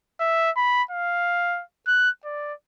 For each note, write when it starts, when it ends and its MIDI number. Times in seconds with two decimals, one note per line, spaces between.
0.20 0.51 76
0.57 0.83 83
0.91 1.63 77
1.88 2.10 90
2.25 2.53 74